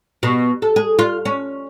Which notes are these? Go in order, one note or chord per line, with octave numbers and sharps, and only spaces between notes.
B2
A4
G#4
F4
C#4